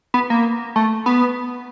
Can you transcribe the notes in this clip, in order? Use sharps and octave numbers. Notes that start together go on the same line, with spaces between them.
B3
A#3
A3
B3